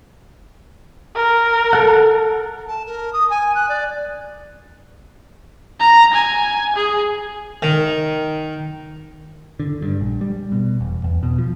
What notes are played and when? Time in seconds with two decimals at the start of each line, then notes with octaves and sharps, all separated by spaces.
1.16 A#4
1.73 A4 F#5
2.68 A5
2.86 A#4
3.13 D#6
3.30 G#5
3.55 F#6
3.69 D5
5.80 A#5
6.14 G#5
6.76 G#4
7.62 D#3
9.60 D3
9.82 G2
10.01 A#1
10.21 G3
10.52 B2
10.81 E1
11.04 E2
11.23 B2
11.38 F3